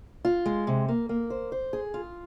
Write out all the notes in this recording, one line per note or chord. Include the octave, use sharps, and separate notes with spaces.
F4
G#3
C3
A#3
A#3
C5
C5
G#4
F4